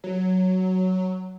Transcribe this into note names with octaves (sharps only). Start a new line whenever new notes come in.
F#3